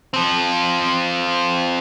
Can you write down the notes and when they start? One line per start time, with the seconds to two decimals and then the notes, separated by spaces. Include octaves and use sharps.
0.14 F3 C4